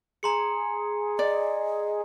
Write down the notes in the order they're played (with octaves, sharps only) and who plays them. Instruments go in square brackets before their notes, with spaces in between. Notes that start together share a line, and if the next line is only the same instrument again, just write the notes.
[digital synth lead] G#4 [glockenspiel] A#5 C6 C#7
[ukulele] D5 [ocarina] D#5